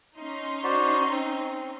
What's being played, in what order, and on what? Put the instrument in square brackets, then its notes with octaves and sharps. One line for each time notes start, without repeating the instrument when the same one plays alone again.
[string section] C#4 D#4 C6
[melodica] F#4 C5 D5
C4